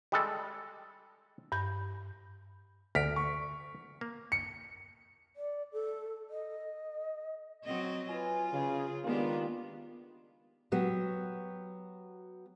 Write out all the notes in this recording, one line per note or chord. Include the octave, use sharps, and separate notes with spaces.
G3 G#3 A4
G2 G6
D2 F6 B6 D7
C#6
A#3
C#7
D5
A4
D#5
F#3 C4 D#5
F4 B4 G#5
C#3 G#4
D#3 G#3 A#3 B3 D4 F4 G4
F#3 B3 F#4 G4